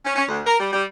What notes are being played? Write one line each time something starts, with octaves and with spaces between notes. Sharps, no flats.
C#4
C#4
D2
A#4
G3
G3